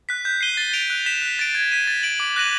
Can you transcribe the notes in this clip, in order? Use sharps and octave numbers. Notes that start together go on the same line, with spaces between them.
F#6 B6
G6
C7 D#7 G7
A6
D7 F7
F#6
B6 E7 G7
F#6
A6 D7
G#6
B6 D#7
A6
D7 F#7
D6
F#6 A#6 D#7 F#7